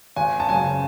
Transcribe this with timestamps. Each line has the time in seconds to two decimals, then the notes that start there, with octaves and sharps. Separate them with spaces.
0.16 G#1 G#5
0.40 A5
0.49 F#2 C#3 G#5